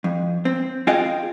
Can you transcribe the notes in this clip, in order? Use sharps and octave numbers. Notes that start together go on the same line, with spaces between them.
F2
C4
C4 F4 G#4 D#5 F5 G5